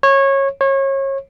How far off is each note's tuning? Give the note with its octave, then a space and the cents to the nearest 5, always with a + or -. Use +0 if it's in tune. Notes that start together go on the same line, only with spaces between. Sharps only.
C#5 -20
C#5 -30